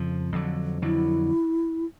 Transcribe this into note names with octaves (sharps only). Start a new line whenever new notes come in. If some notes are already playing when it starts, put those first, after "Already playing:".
Already playing: F2 C#3 F3
F2 D3 F#3
F2 D3 F#3 E4